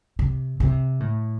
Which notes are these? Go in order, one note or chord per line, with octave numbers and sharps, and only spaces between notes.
C3
C3
A2